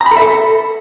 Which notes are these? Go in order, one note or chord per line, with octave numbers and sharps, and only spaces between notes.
A#5
B5
A4
E5
A4